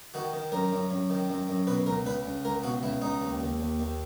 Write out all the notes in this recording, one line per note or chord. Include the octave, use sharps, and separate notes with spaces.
D#3 F#4
D#3
F#2 A#4
F#2
F#2
D#3
F#2
F#2
B2 B4
C#2 A#4
C#2 B4
C#2
C#2 A#4
B2 F#4
C#2 E4
C#2 D#4
D#2
D#2
D#2
D#2